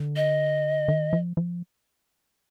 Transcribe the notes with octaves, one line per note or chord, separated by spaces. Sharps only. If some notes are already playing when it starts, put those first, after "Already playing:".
Already playing: D3
D#5
D#3
F3
F3